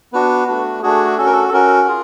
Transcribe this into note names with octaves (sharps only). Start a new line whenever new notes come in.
B3 D4 F#4 B4
A3 D4 F#4
A3 D4 F#4 G#4
C#4 F#4 A4
A#4
A4
A4
C#4 F#4 A#4
F4 G#4